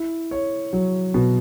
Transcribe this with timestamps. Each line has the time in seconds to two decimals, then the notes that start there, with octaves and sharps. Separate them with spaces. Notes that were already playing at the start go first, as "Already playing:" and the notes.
Already playing: E4
0.31 C#5
0.73 F#3
1.14 B2